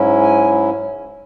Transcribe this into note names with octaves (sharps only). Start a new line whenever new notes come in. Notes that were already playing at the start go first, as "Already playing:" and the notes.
Already playing: G#2 F#3 C#4 E4
G#5